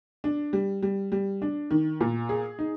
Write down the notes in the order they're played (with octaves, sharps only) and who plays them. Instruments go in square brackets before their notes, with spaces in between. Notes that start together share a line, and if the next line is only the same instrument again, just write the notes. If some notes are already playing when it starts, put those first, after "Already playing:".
[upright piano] D4
G3
G3
G3
D4
D#3
A#2
G#4
D#4